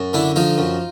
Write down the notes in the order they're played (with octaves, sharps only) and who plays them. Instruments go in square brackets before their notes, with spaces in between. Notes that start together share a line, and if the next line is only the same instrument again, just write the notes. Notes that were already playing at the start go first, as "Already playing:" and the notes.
Already playing: [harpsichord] F#2
D3 D4 E4
F3 D#4 F4
F#2